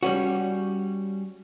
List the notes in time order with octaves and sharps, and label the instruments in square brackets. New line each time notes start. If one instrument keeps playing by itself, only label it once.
[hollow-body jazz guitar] G3 C#4 F#4